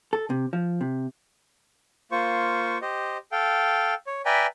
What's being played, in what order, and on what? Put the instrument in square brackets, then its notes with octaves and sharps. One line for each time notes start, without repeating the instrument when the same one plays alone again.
[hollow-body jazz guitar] A4
C3
F3
C3
[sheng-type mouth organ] A#3 F4 C5 C#6
G4 C5 D#5
A4 F5 G5
C#5
B4 D5 E5 G5 G#5 A#5